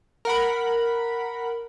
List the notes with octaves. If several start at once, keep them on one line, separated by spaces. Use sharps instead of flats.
A#4 F#5 B5